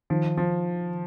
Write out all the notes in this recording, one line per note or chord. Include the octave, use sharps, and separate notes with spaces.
D#3 F3
F3